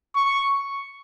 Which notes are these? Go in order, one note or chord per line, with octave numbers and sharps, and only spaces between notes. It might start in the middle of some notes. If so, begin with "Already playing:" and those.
C#6